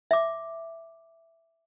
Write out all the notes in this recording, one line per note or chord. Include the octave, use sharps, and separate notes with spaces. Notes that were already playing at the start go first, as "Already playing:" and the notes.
E5 D6